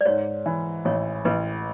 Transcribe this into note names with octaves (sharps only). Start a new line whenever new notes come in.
D5
G#2 C#5
E3
A1 C#5
A1 B4